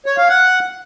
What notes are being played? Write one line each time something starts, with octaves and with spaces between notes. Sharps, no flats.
C#5
F5
F#5